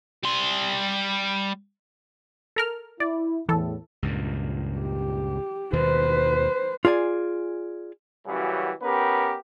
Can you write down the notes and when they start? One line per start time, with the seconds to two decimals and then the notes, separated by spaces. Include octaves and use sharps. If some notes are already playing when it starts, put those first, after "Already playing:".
0.24 G3 C6
2.56 A4 A#4 F6
3.00 E4 D5
3.49 E2 A2 E3 A4
4.02 C#2 G2 A#2
4.79 G4
5.73 D#2 B2 D#3 B4 C5
6.85 F4 G#4 D5 G#5
8.26 F#2 C#3 E3 G3 F#4
8.82 B3 C#4 G4 A#4 B4